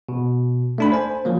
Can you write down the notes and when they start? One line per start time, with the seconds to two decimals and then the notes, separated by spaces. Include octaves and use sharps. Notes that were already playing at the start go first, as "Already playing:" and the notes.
0.09 B2
0.78 A3 D4 B5
0.92 C5 G#5
1.25 F3 F#3 A#3